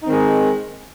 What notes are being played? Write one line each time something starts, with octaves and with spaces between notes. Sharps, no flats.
D#3 G#3 C4 D#4